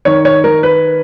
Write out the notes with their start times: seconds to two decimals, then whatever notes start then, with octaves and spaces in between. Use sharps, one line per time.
0.05 D#3 C#5
0.25 C#5
0.44 D#3 A#4
0.63 B4